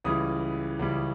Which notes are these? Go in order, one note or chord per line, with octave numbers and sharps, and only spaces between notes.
C#2 C#3 E3 G3 D#6
C#2 C#3 E3 G3